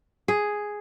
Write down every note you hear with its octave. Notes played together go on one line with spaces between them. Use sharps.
G#4